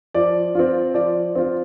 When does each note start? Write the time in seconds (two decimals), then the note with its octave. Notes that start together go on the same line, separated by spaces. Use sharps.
0.14 F3 D5
0.55 C4 F4
0.94 F3 D5
1.35 C4 F4